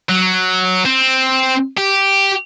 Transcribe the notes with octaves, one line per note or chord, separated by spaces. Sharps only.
F#3
C4
G4